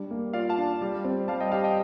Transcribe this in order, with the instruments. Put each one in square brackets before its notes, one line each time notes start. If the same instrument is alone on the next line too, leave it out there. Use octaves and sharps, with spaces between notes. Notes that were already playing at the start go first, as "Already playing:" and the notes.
Already playing: [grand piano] G3 D4
A#3
[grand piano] F4 [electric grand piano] D5 F5
[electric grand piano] F5 A5
[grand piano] D4
G3
C4
[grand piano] G3 [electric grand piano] F5 A5
[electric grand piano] D#5 G5
[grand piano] G4 [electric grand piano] F5 A5
[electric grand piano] D#5 G5